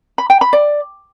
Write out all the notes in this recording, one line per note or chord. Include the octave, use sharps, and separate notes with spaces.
B5
G5
B5
D5